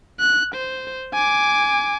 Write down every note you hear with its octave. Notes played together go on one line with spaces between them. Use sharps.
F#6
C5
G#5 D6